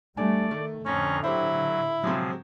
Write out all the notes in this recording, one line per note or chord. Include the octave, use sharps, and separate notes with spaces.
G3 A3 D4 D5 G#5
D#3 A3
F2 A2 D3 F3 C#4 C#5 A#5
F#3 E4 G4 C5
C3 F3 F#3 G#3 C4 G#4